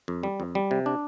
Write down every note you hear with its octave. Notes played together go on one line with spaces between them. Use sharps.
F2
G3
F2
G3
C3
D4